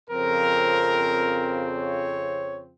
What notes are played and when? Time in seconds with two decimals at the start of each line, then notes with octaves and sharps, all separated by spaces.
0.10 F2 C#3 F3 C4 A#4
1.75 C#5